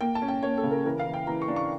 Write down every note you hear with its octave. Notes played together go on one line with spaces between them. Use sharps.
A#3 G5
A5
C#4
G5
A#3 C#5
A4
C#3
A#4
E3 A#4
F5
E3
G5
E3 A#5
C#6
D4
C#6